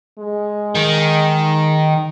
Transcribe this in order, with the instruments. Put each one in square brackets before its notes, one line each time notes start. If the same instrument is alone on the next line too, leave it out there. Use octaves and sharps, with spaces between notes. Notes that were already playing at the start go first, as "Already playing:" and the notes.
[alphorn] G#3
[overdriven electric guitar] D#3